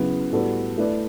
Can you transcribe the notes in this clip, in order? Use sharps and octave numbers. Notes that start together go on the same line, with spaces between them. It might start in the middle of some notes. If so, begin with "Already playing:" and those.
Already playing: C#3 F#3 B3 E4
A2 G3 B3 F#4 A4
A3 E4 B4 D5